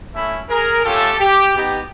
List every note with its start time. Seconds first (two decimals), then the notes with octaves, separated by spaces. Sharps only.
0.14 A3 C#4 E4
0.50 G#4 A#4
0.85 A3 C#4 F4 G4 A4
1.20 G4
1.57 B3 D#4 G4